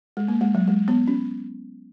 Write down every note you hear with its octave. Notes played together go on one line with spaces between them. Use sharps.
G#3
A#3
G#3
F#3
G#3
B3
C#4